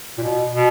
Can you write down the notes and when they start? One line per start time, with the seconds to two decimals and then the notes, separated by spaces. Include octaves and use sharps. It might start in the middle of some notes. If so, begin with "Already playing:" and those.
0.18 A#2
0.23 B2
0.52 B2